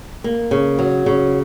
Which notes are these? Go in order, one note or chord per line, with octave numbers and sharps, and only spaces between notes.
A#3
C#3
F#3
C#3